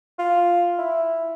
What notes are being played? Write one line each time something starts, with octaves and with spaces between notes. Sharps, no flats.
F4
E4